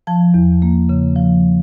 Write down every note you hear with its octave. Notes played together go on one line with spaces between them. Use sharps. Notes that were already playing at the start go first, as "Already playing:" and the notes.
F3 A5
E2
A#3
C#3
F3